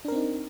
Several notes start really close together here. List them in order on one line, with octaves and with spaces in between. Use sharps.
D4 A#4 C4 D#4